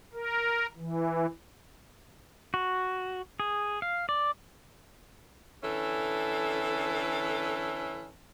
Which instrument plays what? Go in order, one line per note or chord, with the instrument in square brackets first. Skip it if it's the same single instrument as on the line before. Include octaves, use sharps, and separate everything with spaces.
[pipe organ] A#4
E3
[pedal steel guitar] F#4
G#4
F5
D5
[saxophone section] D3 E3 C#4 A4